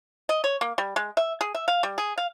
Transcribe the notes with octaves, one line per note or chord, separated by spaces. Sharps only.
D#5
C#5
A#3
G3
G#3
E5
G#4
E5
F5
G3
G#4
F5